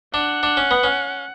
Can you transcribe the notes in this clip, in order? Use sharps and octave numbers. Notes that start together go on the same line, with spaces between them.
D4 F#5
D4
C#4
B3
C#4